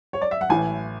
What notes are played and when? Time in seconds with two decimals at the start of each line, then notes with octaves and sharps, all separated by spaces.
0.13 C#5
0.21 D5
0.31 E5
0.41 F#5
0.49 A1 A2 E3 G#5